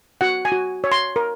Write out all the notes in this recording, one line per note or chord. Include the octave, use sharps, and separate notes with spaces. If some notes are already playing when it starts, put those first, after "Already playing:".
F#4 F#5
G#5
F#4
C#5
C6
A#4